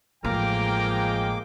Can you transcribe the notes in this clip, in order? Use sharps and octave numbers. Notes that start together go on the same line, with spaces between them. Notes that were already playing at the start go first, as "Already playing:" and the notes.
A1 F3 G#3 A#3 A#4 G5 D6